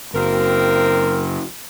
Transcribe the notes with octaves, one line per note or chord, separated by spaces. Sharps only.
F#1 A#3 C4 A#4